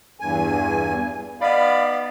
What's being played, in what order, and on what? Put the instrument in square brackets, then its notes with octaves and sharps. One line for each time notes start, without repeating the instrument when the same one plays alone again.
[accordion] E2 G2 G#5
[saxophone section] B3 D#4 D5 [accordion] F5 B5